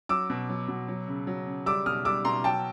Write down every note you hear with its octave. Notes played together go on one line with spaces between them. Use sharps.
F#3 D6 E6
B2
F#3
B2
F#3
C#3
F#3
C#3
G3 D6 E6
B2 D#6 F6
G3 D6 E6
B2 A#5 C6
F#3 G5 A5